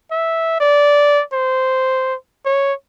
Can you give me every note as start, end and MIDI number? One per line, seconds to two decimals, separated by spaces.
0.11 0.57 76
0.60 1.22 74
1.33 2.15 72
2.45 2.73 73